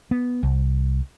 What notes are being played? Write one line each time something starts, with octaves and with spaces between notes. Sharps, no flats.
B3
C2